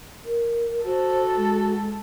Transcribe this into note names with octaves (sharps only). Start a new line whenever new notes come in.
A#4
F#4 A4 C5
G#3